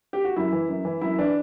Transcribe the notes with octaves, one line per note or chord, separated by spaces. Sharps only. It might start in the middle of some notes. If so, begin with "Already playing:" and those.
G4
F#4
F#2 E4
E3
F#2
E3
F#2 E4
E3 D4